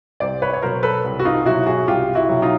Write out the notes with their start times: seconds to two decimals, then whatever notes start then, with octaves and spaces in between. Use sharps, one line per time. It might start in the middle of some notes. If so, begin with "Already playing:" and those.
0.20 C2 C5 D5
0.42 B4 C#5
0.53 C#5
0.62 B2 F#3 A#4 C5
0.83 A4 B4
1.04 C2
1.19 F#4
1.25 D#4 F4
1.45 B2 F#3 E4 F#4
1.66 F#4 G#4
1.88 C2 F4 G4
2.15 E4 F#4
2.29 B2 F#3
2.42 D#4 F4